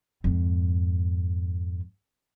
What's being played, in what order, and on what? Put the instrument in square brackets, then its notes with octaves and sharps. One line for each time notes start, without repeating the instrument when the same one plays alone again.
[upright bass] F2 G#2